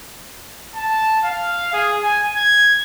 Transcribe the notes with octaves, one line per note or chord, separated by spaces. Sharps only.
A5
F5
G#4
G#5
G#6